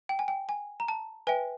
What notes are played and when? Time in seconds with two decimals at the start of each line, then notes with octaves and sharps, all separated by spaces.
0.09 G5
0.19 G#5
0.28 G5
0.49 G#5
0.80 A#5
0.88 A5
1.27 B4 E5 G5 G#5